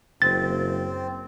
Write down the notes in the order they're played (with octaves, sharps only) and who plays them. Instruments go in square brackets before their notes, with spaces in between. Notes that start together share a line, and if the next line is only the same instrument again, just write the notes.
[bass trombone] F#1 [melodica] C4 [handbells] A6